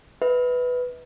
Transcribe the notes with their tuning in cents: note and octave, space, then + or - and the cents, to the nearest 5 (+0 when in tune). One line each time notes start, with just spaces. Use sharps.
B4 +0 E5 -45